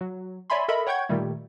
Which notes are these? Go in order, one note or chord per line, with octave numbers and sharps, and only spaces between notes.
F#3
C#5 D5 E5 G#5 B5 C6
A4 A#4 D#5 E5 B5
C#5 F#5 G5 C#6 G6 G#6
A#2 D#3 G3 A3